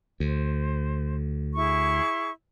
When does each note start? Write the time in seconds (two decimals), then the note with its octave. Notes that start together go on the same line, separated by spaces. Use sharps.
0.20 D2 C5
1.54 E4 G#4 C#6